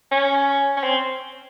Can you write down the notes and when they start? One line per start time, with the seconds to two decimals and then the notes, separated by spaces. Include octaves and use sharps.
0.11 C#4
0.76 C#4
0.83 C4